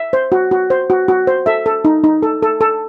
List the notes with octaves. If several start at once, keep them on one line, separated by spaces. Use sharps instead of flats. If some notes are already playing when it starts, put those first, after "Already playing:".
Already playing: E5
C5
F#4
F#4
C5
F#4
F#4
C5
A4 E5
A4
D#4
D#4
A4
A4
A4